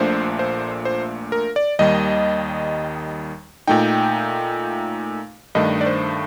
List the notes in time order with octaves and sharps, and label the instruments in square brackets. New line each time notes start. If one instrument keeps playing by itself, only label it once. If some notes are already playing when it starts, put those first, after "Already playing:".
Already playing: [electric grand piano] A#1 A#2 A3 D4 C5
C5
C5
A#4
D5
D#2 D#3 G3 D#5
A#2 A3 D#4 G5
G2 D#3 A3 D4 D#5
D5
C5